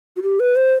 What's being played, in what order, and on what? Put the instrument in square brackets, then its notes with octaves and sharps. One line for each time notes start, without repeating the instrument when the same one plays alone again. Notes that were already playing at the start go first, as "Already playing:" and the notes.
[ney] F#4
G4
B4
C5